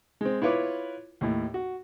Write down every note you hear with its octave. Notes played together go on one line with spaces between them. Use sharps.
G#3 C4
E4 F4 B4 C#5 D6
D#2 A2
F#4